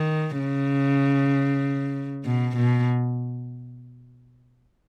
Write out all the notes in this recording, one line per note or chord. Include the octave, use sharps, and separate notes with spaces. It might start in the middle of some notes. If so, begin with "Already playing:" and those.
Already playing: D#3
C#3
B2
B2